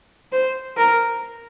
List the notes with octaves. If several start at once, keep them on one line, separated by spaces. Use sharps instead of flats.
C5
A#4